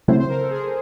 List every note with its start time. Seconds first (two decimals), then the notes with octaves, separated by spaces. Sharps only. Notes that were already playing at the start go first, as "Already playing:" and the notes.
0.08 C#3 F#3 A3 C4 E4 C5
0.20 C5
0.29 A#4
0.40 A4
0.51 G#4